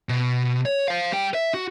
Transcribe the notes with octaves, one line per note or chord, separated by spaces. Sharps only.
B2
C#5
C5 F5
G3 G5
E5
F#4